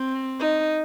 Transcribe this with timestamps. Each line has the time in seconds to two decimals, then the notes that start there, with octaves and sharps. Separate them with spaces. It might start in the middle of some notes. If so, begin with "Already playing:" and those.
Already playing: C4
0.40 D#4